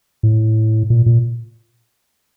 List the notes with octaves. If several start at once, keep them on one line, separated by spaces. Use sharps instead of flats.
A2
A#2
A#2